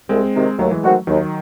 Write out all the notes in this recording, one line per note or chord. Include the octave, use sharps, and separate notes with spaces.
C2 G#3 C4
C3 D#3
D#2 F#3 A3
E3 G#3
D#3 F#3 G#3 A3 C4 F#4
D#2 D#3 F#3